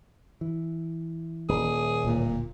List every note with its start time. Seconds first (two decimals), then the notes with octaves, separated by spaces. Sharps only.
0.41 E3
1.49 D#1 G#4
2.05 D1 A#2